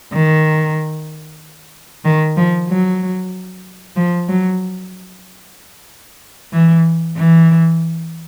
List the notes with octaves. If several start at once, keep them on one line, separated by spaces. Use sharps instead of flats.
D#3
D#3
F3
F#3
F3
F#3
E3
E3